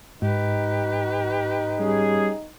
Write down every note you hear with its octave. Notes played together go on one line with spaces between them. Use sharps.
G#2 D#4 G4 B4
G3 C#4 G#4